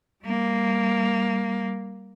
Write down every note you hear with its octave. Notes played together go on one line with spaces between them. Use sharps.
G3 A#3